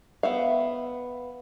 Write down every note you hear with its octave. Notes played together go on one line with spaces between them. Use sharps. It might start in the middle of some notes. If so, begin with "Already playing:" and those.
B3 E5 F5